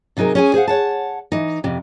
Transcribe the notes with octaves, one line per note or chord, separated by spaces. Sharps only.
C3 F#3 D#4 G#4 A#4
C#4 G#4 G#5
G#4 C5 F5 F#5
C#5 F#5 A5
E3 D#4
F2 C3